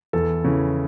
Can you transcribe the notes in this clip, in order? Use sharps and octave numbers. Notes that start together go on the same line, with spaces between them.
E2 A4
C#3 E3